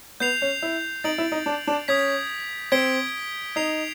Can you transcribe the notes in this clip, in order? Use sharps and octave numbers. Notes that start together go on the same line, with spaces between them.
B3 G6 C7 F7
C#4
E4
D#4 A6 D7 F#7
E4
D#4
D4
D4
C#4 D#6 G#6 B6
C4 G#6 B6 D7 G7
D#4 G#6 C7 F7